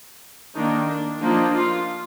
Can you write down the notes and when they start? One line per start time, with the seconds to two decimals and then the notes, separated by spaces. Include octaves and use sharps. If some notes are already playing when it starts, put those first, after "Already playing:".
0.55 D#3 A#3 D4 D#4
0.87 D4
1.21 F3 A#3 D4 D#4
1.53 F4